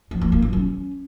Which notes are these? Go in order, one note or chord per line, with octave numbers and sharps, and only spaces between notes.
F3
A#3
A#3
F#3
C#4